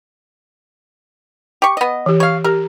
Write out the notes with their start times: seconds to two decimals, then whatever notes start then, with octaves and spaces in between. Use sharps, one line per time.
1.62 G4 C#6
1.77 B3 D#5
2.06 E3 G4
2.20 C#5 F5
2.44 G4 A#4